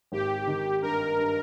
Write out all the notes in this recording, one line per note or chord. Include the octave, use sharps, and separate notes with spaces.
G#1 G4
D#3
G2 A#4
G2